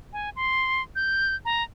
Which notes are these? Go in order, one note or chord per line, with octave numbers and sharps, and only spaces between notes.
G#5
C6
G6
A#5